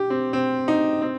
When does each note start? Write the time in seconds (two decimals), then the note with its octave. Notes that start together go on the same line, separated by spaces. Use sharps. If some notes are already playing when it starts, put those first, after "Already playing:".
Already playing: G4
0.10 C4
0.33 C4
0.68 D#4
1.02 C4